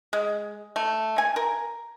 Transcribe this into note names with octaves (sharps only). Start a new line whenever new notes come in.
G#3
A3
G#5
A#4